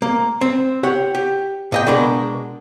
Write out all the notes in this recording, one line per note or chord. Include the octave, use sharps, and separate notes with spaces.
A#3
C4
G4 C#5 F#5
G4
A#2 D#5 G5
B2 G#3 D4 A#4